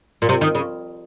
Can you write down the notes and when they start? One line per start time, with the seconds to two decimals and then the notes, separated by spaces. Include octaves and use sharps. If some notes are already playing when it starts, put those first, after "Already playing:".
0.22 A#2
0.29 C3
0.41 D#3
0.55 C#3